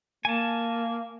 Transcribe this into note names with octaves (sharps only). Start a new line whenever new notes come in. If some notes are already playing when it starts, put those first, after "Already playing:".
A#3 G#5 A5